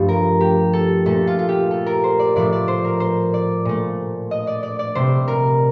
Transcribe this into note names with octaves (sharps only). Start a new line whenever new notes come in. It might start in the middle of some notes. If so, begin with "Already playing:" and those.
Already playing: G2 F3 A3
A#4
G4
A4
A#2 A3 A4
F4
F4
G4
A4
A#4
C5
D5
A2 F3 A3 D5
D5
C5
A#4
C5
D5
A#2 A3
D#5
D5
D5
D5
C3 G3 C5
A#4